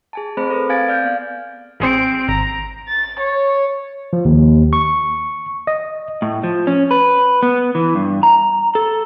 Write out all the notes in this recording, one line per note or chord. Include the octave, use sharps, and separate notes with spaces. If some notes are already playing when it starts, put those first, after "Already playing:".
G#4 G#5 A5
A3 C4 G#4 C5 B5
A4 B4
C4 F5 G#5 G#6 A6 D7
D5 F6 G6
B3 F5
A1 C4 G#4 C5 D7
G#1 A#5
A6
C#5
F3
D#2
C#6
D#5
A2
F3
C#4
B4
B3
E3
G2
A#5
A4